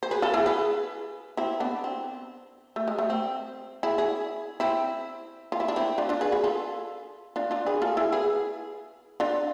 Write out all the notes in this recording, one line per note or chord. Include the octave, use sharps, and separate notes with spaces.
C5
G#4 B4
F4 A4
E4 G#4
G#4 B4
C4 E4
B3 D4
C4
A3
G#3
A3
C4
E4 G#4
E4 G#4
C4 E4
F4
E4
D4
C4 E4
D4 F4
D4 F4
G#4 B4
G#4 B4
F4 A4
D4 F4
D4 F4
G#4 B4
F4 A4
E4 G#4
G#4 B4
D4 F4